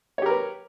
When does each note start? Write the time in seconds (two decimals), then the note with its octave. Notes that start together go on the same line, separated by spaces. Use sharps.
0.18 C#5
0.22 G4
0.26 A#4
0.30 B4